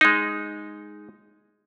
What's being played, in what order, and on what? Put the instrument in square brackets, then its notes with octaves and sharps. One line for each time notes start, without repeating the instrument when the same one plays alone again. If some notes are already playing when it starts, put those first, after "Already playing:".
[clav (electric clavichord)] G#3 D#4